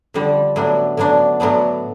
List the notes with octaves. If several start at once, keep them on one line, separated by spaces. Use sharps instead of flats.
F2 D3 G3
A2 F#3 B3 D4
A2 F#3 B3 D4
A2 F#3 B3 D4